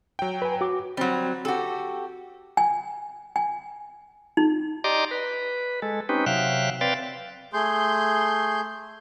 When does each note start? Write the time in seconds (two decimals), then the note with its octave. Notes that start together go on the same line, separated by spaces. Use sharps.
0.19 F#3 G5
0.42 B4 G#5
0.61 F#4 D6
0.97 F#3 G3 C4
1.45 F#4 G4 A4
2.57 G#5
3.36 G#5
4.37 D#4
4.84 G4 D5 D#5 A#5 C6 D6
5.11 B4
5.82 G#3 A4
6.09 C4 C#4 D#4 G4 B4
6.26 C3 F#3 E5 F5 G5 F#6
6.81 C4 B4 D5 F5 G5 A6
7.53 A3 G#4 C6 G6